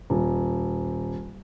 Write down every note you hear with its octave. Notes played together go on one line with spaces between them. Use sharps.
D#1